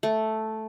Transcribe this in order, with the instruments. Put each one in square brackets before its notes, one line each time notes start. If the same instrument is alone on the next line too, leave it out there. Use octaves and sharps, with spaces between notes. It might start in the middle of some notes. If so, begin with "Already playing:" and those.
[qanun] A3